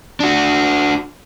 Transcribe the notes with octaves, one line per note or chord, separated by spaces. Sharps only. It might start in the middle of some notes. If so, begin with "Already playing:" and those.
D4 F#4